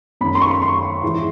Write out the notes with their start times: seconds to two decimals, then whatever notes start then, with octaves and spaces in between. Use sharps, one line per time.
0.21 F#2 D#3 B5
0.35 C6
0.42 C#6
0.62 C6
1.03 G#2 E3